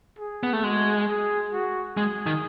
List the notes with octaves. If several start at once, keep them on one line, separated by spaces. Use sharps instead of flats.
G#4
B3
A3
G#3 F#4
G#4
F#4
G#3 G#4
D#3